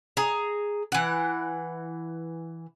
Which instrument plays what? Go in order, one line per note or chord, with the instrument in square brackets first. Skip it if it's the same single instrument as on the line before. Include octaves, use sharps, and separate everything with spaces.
[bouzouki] G#4 A#5
E3 F#5